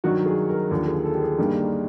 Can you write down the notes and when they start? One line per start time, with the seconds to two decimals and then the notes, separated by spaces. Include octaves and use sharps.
0.04 G2 D#3 F#3 F#4
0.26 G#4
0.49 A#4
0.71 D#2 D3 F3 G#4
0.88 G#4
1.05 A4
1.14 G4
1.22 G#4
1.38 G2 D#3 G3 A#3